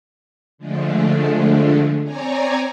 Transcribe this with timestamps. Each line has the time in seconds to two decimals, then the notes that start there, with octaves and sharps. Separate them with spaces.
0.58 D3 F3 G#3 A3 D4
2.04 C4 C#5 D5 G#5 A#5